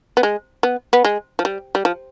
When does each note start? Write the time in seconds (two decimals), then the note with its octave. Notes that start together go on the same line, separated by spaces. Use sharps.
0.17 B3
0.23 G#3
0.63 B3
0.93 B3
1.05 G#3
1.39 F3
1.45 G3
1.75 G3
1.85 F3